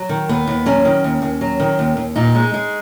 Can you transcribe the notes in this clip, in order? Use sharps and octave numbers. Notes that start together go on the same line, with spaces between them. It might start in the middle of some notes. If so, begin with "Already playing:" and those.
Already playing: F#3
D#3
D#2 B3
D#2
F#3 C#4
D#3
D#2
D#2
F#3
D#3
D#2
D#2
A#2 D#4
G#3
G#3